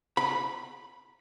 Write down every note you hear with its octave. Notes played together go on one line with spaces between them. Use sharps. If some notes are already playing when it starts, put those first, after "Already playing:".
B5